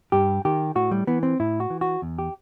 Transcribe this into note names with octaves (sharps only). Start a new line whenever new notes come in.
G2 G4
D#3 G4
A2 F#4
G3
E3 B3
C4
A2 E4
F#4
E3
F#4
E2
G4